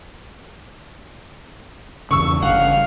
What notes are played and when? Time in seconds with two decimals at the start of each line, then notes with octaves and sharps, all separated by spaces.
2.11 E2 G2 C#3 C#6 E6
2.42 G1 G2 C#3 F5 F#5